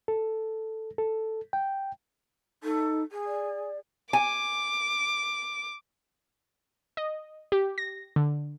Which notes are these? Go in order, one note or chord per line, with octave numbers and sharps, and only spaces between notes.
A4
A4
G5
D#4 A4
G#4
D5
G#5 D6
D#5
G4
A#6
D3